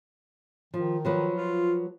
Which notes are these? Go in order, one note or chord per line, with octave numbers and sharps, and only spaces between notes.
D#3 F3
F3 F#3 B4
F4